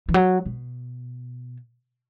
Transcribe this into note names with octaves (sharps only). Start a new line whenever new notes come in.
E3
F#3
B2